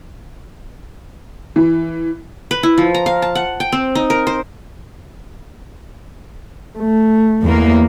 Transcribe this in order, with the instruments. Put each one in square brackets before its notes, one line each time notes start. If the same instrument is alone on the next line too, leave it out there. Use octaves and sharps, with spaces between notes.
[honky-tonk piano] E3
[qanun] B4
E4
F3
A#5
F5
A5
F#5
G5
C4
D#4
A#4
C5
[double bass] A3
[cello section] E2 A#3